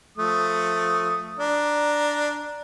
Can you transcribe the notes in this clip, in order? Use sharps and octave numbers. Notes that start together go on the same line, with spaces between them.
F3 A3 D#6
D4 A#5